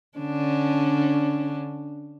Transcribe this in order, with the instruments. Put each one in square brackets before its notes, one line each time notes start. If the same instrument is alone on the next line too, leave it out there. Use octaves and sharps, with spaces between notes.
[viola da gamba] D3 C#4 D4